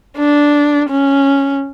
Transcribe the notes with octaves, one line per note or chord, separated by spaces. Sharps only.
D4
C#4